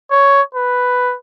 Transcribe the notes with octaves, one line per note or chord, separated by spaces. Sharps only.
C#5
B4